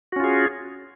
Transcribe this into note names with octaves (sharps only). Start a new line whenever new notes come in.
C#4 F4 F#4 G#4